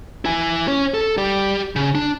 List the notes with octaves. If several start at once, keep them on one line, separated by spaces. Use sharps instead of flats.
E4 G#5
C#4
A4
G3 G4
C#3
D4